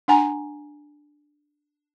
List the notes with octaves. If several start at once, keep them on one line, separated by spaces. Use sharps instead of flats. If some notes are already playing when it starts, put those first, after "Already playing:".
D4 F#5 G#5 A#5